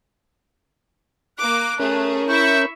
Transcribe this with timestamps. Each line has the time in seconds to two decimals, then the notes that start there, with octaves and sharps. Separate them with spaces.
1.39 A#3 D6 F#6
1.79 A3 C#4 G#4 A#4
2.29 E4 E5 C#6 G6